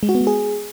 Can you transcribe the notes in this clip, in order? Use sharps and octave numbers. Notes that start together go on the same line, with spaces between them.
G#3
F#4
B3
G#3
G#4